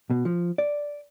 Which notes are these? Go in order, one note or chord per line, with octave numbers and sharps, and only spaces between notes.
B2
F3
D5